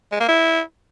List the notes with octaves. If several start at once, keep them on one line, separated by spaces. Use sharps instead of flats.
G#3
A#3
E4